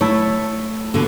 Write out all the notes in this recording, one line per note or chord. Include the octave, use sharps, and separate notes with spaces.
A3 E4 A4 C#5
B2 D3